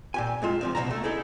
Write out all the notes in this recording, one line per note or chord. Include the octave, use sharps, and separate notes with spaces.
A#2 G4 G#5
F2 G#3 F4 A5
C3 D#3 F3
C2 B2 G#3 C#4 A5 A#5
A3
D#4 E4 G#4 A4